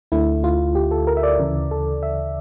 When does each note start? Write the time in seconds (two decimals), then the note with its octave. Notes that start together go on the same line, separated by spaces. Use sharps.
0.12 D2 D3 A3 E4
0.44 F4
0.75 G4
0.91 A4
1.07 A#4
1.17 E5
1.23 D5
1.39 D2 C#3 E3
1.71 A4
2.03 E5